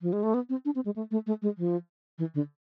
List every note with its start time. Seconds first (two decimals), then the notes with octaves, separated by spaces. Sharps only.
0.02 F3
0.13 G#3
0.23 A3
0.34 B3
0.49 C4
0.65 D4
0.75 C4
0.85 G#3
0.96 A3
1.11 A3
1.27 A3
1.42 G#3
1.58 F3
2.18 E3
2.34 D3